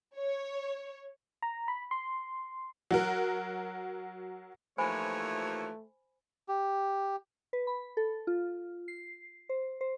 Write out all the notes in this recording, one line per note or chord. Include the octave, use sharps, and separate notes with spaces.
C#5
A#5
B5
C6
F#3 F#4 A#4
D#2 E3 F3 A3 C5 C#5 G#5 B5
G4
B4
B5
A4
F4
C7
C5
C5